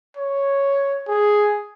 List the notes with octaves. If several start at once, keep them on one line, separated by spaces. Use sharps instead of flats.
C#5
G#4